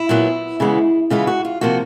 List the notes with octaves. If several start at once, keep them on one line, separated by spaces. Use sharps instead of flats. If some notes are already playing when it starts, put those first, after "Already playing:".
Already playing: E4
A#2 F#3 B3
C#3 E3 G#3 B3
C#3 E3 G#3 B3 F4
F#4
F4
C3 F3 A#3 F#4